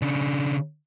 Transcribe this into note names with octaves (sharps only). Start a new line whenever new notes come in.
C#3 D4